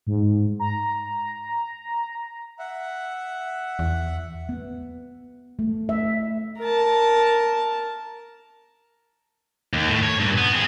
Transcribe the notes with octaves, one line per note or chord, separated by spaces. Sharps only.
G#2
A#5
E5 F#5
E2
B3
A3
E5
A#4 A5
D#2
A2
C#5
G2 A#2
B3
C4 G#4